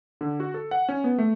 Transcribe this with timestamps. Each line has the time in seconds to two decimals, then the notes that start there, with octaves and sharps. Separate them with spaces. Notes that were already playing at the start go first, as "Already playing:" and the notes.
0.21 D3
0.40 F#4
0.54 A4
0.71 F#5
0.89 C#4
1.04 B3
1.18 A3